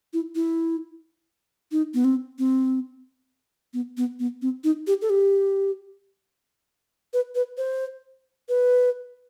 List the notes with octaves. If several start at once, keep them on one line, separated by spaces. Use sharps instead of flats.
E4
E4
D#4
B3
C4
C4
B3
B3
B3
C4
D#4
G4
A4
G4
B4
B4
C5
B4